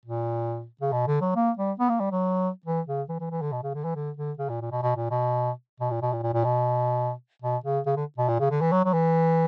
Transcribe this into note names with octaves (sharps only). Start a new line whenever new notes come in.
A#2
C#3
B2
D3
F#3
A#3
G3
B3
A#3
G3
F#3
E3
C#3
E3
E3
E3
D3
B2
C#3
D3
E3
D3
D3
C#3
A#2
A#2
B2
B2
A#2
B2
B2
A#2
B2
A#2
A#2
A#2
B2
B2
C#3
C#3
D3
B2
A#2
C#3
D3
E3
F#3
F#3
E3